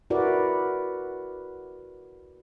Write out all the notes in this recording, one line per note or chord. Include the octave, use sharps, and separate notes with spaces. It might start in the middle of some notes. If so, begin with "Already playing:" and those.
E4 F#4 A#4 B4 D5